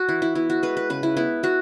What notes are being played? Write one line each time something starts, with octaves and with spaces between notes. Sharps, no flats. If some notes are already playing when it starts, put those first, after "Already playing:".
Already playing: F#4 G#5
E3 E4
E4
B3 E4
F#4
G#3 B4
B4
C#3 B4
E4
B3 E4
B3 F#4